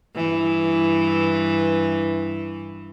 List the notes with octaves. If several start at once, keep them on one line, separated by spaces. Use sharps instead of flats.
G2 E3